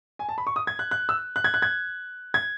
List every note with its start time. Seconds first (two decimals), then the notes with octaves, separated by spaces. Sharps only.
0.19 G#5
0.29 A5
0.38 B5
0.47 C#6
0.56 D#6
0.67 G#6
0.79 F#6
0.91 F#6
1.09 E6
1.36 F#6
1.44 G#6
1.54 F#6
1.62 G#6
2.34 G#6